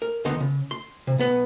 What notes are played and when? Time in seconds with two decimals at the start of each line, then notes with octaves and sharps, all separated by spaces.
0.02 A#4
0.25 C#2 D3 D#3 B3 D#4 C6
0.40 C#3
0.71 C6
1.07 C3
1.18 B1 B3 B4